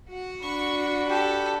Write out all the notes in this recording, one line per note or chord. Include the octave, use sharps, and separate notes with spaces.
F#4 F#5
D4 B5 C#6
G4 A4